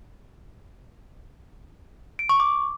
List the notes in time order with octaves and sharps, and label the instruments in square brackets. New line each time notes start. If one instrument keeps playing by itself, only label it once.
[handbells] D7
C#6
D6